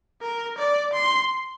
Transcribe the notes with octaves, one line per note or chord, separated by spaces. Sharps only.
A#4
D5
C6